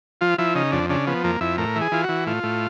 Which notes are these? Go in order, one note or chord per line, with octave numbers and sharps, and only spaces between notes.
F3 F4
F3 E4
C#3 D#4
F2 D4
C#3 D4
F3 B3
F2 A#3
F2 E4
A2 A#4
E3
G#4
E3 F4
F#4
E3
A2 F4
A2